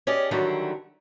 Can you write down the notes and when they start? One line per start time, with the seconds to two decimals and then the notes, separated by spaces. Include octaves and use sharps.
0.07 C#4 G4 G#4 D5 D#5
0.31 D3 D#3 F#3 G3 E4